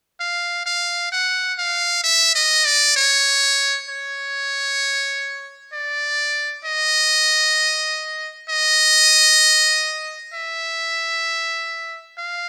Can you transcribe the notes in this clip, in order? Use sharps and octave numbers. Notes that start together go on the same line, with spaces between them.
F5
F5
F#5
F5
E5
D#5
D5
C#5
C#5
D5
D#5
D#5
E5
F5